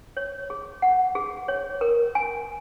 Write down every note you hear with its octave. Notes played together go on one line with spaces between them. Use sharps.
C#5
G#4
F#5
G#4
C#5
A#4
G#5